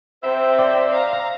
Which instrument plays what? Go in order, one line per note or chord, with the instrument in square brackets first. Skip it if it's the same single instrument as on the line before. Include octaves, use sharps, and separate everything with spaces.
[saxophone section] C3 E5 [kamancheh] C4 [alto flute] C5
[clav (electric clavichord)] D5
[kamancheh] F5 A#5